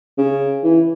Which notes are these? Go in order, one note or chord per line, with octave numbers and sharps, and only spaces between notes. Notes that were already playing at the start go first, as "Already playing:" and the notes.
C#3
E3